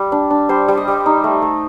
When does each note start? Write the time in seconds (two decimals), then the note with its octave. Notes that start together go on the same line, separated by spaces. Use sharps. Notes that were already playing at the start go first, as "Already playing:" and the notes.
Already playing: G3 G4
0.12 D4
0.30 D4
0.49 G3 C5
0.68 G3
0.77 D#5
0.88 G3
1.06 D#4
1.24 A3
1.42 A3